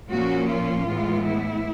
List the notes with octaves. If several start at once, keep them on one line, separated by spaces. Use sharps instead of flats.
A#2 F3 A#3 C#4 F#4
F4
A2 E3 G#3 B3
E4